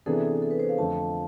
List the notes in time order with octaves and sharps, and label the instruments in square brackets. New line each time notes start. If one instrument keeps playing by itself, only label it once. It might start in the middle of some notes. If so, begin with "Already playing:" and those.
[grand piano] C3 E3 B3 D4 G#4 [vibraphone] A4
[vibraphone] A4
B4
C5
F5
[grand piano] F2 D3 F3 A3 [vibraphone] A5